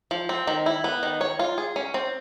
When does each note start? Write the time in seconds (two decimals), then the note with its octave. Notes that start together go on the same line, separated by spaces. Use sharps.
0.11 F3
0.29 C4
0.47 D#3
0.66 E4
0.84 B3
1.03 D#3
1.21 C#5
1.39 F4
1.58 G#4
1.76 C#4
1.94 C4